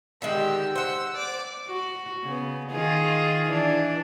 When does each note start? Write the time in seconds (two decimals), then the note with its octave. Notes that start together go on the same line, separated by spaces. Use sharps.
0.22 D3 D#3 G#3 G4 E6
0.75 C5 F#5 E6
1.14 D5 D6
1.68 F#4
2.24 C#3 B3
2.72 D#3 F4 G#4
3.48 E3 D4